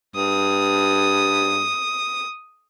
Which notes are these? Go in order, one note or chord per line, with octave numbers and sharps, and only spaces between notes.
G2 D#6